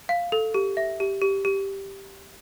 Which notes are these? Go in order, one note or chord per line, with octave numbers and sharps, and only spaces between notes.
F5
A4
G4
E5
G4
G4
G4